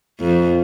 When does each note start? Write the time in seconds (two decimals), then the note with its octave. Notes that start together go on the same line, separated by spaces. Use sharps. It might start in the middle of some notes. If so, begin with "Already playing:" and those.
0.21 F2